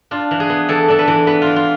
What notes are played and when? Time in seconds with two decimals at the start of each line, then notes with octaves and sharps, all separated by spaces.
0.11 D4 F4
0.31 E3
0.40 G#4
0.50 B3
0.69 E3 A4
0.88 D4 A4
0.99 B4
1.07 E3
1.27 B3 B4
1.42 E3 F4
1.56 F4